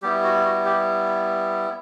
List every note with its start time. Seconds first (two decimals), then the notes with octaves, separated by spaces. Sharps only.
0.02 G3 B3 E4 G4
0.23 F#4
0.44 F#4
0.65 G4